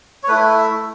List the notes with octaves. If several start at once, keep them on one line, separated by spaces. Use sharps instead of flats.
C#5
A3 E4 B4
E5